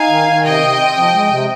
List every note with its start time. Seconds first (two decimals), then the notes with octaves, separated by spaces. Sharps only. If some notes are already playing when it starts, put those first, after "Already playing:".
Already playing: D#4 F5 G#5
0.09 D#3
0.27 D#3
0.44 C3 D#5 G5
0.61 C3
0.79 C4
0.97 F3
1.13 G#3
1.31 C3